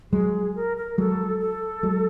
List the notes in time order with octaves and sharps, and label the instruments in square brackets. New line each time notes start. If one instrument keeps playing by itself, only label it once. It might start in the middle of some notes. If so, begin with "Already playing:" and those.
[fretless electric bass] F#3 G#3 [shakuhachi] G#4
[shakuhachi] A#4
A#4
[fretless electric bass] F#3 G#3 [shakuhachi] A4
[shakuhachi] A4
[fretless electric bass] F#3 G#3